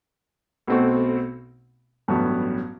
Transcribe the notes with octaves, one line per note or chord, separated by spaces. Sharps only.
B1 B2 A3 C4 F#4
A1 G2 F#3 B3 F#4